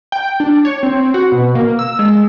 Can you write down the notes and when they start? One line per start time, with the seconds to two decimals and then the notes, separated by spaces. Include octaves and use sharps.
0.12 G5
0.40 D4
0.65 C#5
0.83 C4
1.14 F#4
1.32 B2
1.55 A#3
1.79 E6
1.99 G#3